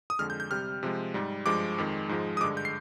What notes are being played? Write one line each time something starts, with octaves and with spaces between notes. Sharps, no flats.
D#6
F2 D3 G#3 F6
G6
G6
C3 G3 F6
C3 F3 G#3
G#2 G3
G2 F3 G#3 D6
F2 D#3 G#3
G#2 F3 G#3
D#6
G2 D3 G#3 D6
G6
C7